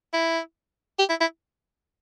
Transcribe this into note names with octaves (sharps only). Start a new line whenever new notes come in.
E4
G4
E4
E4